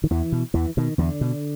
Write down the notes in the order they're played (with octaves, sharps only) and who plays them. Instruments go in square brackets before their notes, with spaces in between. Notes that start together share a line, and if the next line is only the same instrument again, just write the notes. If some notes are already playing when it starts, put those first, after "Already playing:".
[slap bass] D#3
E2 E3
B2
E2 E3
B2 D#3
E2 D3
B2